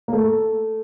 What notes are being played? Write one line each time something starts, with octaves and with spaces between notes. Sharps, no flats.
A#3
A3